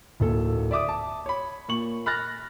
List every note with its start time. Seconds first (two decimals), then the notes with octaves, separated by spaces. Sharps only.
0.20 D1 A#2 A4
0.71 D5 E5 D6 D#6
0.88 A5
1.26 C#5 B5
1.68 A#2 C#6 F#7
2.06 B5 F6 F#6 A6 A#6